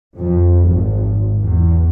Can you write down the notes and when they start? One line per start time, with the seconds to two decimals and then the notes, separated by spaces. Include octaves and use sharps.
0.17 F2
0.66 G#1
1.40 E2